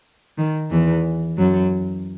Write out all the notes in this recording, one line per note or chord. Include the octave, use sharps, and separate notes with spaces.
D#3
E2 E3
F#2 F#3